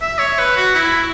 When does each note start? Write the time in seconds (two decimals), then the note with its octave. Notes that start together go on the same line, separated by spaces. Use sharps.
0.02 E5
0.19 C#5
0.39 B4
0.57 F#4
0.75 E4